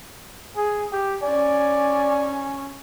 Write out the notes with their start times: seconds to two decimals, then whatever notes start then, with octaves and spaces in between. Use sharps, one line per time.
0.57 G#4
0.92 G4
1.23 C#4 D5 G#5